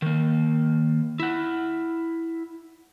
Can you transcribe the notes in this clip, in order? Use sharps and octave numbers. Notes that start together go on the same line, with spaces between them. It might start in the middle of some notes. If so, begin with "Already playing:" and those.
D#3 A#3
E4 F#5